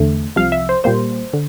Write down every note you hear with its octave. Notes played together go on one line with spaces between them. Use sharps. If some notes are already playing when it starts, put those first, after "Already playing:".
Already playing: E2 D3 A3
C2 C3 F3 F5
E5
C5
A#2 G3 A#3 C5
D3